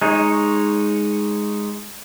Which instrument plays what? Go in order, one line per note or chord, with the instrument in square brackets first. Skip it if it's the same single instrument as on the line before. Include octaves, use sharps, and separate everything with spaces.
[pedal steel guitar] G#3 D#4 C#5